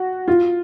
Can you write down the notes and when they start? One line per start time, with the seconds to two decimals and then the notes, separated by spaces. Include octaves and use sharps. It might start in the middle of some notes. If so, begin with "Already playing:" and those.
Already playing: F#4
0.28 F4